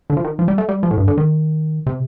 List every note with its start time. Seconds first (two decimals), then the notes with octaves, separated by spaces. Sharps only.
0.10 D3
0.17 F3
0.24 D#3
0.39 F3
0.48 G3
0.58 A3
0.69 G3
0.83 F3
0.91 A2
0.98 G2
1.08 D3
1.17 D#3
1.86 C3